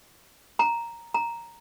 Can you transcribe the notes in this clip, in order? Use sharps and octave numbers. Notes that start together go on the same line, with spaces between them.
A#5
A#5